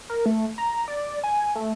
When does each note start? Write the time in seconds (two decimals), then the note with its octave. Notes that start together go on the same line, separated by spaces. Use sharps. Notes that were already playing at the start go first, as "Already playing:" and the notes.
0.10 A#4
0.26 A3
0.58 A#5
0.88 D5
1.24 G#5
1.56 A3